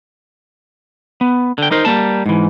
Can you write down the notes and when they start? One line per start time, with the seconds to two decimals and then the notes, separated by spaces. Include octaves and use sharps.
1.21 B3
1.58 D3 G5
1.71 D#4 A#4 C5
1.85 G3 A#3 A5
2.26 G#2 E3